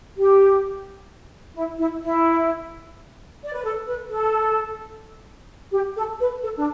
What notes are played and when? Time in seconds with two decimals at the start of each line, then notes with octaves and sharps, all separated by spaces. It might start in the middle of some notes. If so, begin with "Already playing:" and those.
0.16 G4
1.55 E4
1.79 E4
2.02 E4
3.44 D5
3.54 B4
3.64 A4
3.87 B4
4.10 A4
5.72 G4
5.96 A4
6.19 B4
6.42 A4
6.57 D4